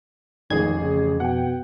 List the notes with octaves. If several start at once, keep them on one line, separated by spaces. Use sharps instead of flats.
A1 F2 D#3 G#3 G#4 G#6
C#3
B2 F#5 G5